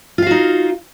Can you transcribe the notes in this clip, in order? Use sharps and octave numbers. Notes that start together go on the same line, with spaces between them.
D#4 F4 F#4 F5